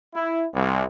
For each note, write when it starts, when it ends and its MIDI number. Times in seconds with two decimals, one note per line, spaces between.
0.14 0.45 64
0.53 0.83 36